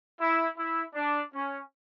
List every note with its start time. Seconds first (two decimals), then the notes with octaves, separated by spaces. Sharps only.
0.19 E4
0.57 E4
0.94 D4
1.33 C#4